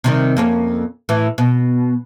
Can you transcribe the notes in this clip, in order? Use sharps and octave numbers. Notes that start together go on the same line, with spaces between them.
C3 D#3 G3
F2 A#3 C#4
A2 E3
B2